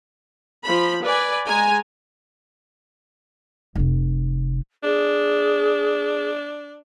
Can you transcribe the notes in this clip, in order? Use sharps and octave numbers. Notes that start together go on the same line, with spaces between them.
F3 B5
B4 D5 G#5
G#3 G#5 A#5
F1 C3
D4 G#4